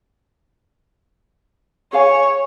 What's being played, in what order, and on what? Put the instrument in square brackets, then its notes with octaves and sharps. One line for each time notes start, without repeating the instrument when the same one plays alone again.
[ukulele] G#4 F5 G#5 [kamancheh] C#5